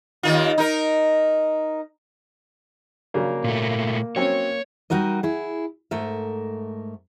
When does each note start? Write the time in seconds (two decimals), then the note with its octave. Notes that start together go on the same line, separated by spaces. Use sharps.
0.23 D#2 D#3 F4
0.58 D#4 A#4
3.14 C#3 F#3 A#3 D4
3.44 A#2 A3
4.16 F#3 C4 C#4 C#5
4.90 G3 D#4 F#4 A#4 D#5
5.23 E4 G#4
5.91 G#2 A3 A#4 E5